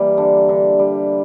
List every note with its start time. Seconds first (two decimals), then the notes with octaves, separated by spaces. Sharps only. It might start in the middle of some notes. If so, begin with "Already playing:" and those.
Already playing: E3 G3 A#3
0.18 D3
0.49 D3
0.79 G3